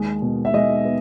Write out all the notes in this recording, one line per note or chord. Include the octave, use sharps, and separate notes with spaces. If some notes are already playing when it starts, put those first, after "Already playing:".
Already playing: D#2 G#3
B2
E5
G#3 D#5
B3